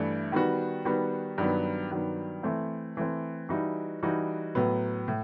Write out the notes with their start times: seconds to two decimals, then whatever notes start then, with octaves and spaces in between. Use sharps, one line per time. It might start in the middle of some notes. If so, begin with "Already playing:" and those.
Already playing: G2 E3 A3
0.32 D#3 G3 B3 F#4
0.85 D#3 G3 B3 F#4
1.38 G2 D#3 F#3 B3
1.91 G2 D#3 F#3 B3
2.43 E3 A3 C4
2.97 E3 A3 C4
3.49 E3 G3 D#4 F#4
4.03 E3 G3 D#4 F#4
4.55 A2 F#3 B3
5.08 A2